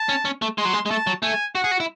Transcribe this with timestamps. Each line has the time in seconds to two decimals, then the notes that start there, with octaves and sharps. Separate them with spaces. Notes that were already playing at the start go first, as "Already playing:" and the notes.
Already playing: A5
0.09 C#4
0.25 C#4
0.42 A3
0.58 G#3 C6
0.65 F#3
0.73 G#3
0.86 G#3
0.91 A3 A5
1.07 F#3
1.22 A3 G#5
1.55 F#4 F#5
1.64 G#4
1.71 F#4
1.80 E4